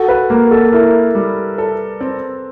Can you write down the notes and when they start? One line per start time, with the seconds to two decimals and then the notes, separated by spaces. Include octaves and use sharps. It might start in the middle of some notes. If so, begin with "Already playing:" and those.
Already playing: F#4 A4
0.09 B4
0.30 A#3 A#4
0.51 A4
0.72 E4 A#4
1.15 G3
1.58 A4
2.01 C4